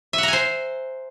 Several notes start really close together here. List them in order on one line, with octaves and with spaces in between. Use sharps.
E5 F#5 A#5 G#5 C5